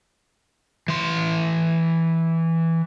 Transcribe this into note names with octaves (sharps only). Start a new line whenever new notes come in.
E3 C6